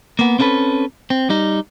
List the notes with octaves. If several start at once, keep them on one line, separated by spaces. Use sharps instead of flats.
A#3 B3
C4 C#4 E4 A4 B4
C4
G3 D#4